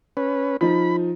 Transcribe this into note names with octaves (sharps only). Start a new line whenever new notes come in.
C#4 B4
F3 D#4 B5